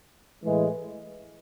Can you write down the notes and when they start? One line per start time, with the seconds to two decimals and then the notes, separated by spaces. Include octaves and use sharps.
0.45 A2 E3 G#3